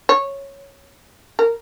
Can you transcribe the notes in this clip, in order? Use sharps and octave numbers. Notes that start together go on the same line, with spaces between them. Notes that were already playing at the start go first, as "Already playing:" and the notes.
C#5
A#4